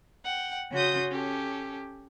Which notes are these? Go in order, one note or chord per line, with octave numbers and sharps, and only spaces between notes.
F#5 G5
C#3 C#4 F#4 C6 D#6 G6
C#4 G4 A4